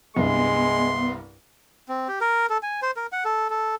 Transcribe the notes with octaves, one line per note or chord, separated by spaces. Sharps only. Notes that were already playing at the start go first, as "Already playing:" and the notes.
C2 G2 G#3 B3 C6
C4
G4
A#4
A4
G#5
C5
A#4
F#5
A4
A4